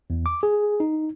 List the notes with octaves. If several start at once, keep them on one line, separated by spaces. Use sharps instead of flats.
E2
D6
G#4
D#4